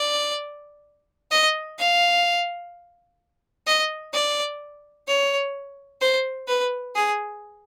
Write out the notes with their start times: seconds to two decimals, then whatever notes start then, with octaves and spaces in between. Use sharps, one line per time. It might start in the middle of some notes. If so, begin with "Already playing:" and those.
Already playing: D5
1.31 D#5
1.79 F5
3.67 D#5
4.13 D5
5.07 C#5
6.01 C5
6.48 B4
6.95 G#4